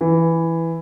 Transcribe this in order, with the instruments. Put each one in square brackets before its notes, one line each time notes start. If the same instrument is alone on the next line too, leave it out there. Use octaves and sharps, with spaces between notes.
[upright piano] E3